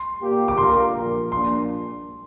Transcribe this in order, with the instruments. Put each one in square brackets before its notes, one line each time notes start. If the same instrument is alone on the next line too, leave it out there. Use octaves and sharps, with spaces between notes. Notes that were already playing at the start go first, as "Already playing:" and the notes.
Already playing: [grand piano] C6
[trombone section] A#2 A#3 G4
[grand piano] D6
[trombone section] D3 A#3 F4 A#4 [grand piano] C6
[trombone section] A#1 A#2 A#3
[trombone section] A#1 A#2 A#3 D4 [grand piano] C6